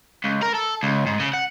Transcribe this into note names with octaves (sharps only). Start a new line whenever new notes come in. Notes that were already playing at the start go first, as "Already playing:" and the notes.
C#2
A#4
A4
C#2
G#2
C#3
F#5